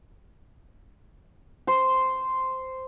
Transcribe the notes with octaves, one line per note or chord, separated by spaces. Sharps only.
C5